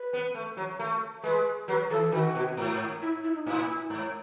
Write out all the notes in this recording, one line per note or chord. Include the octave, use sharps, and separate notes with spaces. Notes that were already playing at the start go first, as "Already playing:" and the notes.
Already playing: B4
B3
A3
F#3
A3
G#3 B4
F#3 B4
E3 A4
D#3 F#4
B2
G#2
E4
E4
D#4
A2 E4
G#2